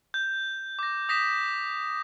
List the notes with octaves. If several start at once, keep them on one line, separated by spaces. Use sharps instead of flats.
G6
D6 A#6
D#6 A#6 B6 E7